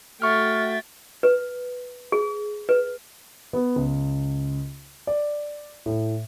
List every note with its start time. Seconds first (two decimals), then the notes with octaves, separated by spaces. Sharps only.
0.22 A3 F#4 E5 G5 C#6 F6 A6
1.23 B4
2.12 G#4
2.69 B4
3.53 B3
3.76 C#2
5.07 D5
5.86 A2